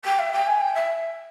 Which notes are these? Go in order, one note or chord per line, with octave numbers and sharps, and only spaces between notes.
G5
E5
G5
G#5
G5
E5